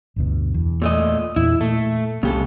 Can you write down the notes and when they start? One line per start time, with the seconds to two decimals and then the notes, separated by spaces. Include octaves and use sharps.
0.16 G1 D2 B2
0.54 E2
0.82 A#2 A3 D#5
1.36 E2 A#2 E4
1.61 A#2 A3
2.23 C2 C#3 G#3 A#3 G4 A4